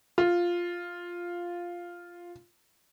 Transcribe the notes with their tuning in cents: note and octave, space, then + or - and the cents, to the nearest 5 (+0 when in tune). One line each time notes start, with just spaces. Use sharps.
F4 +0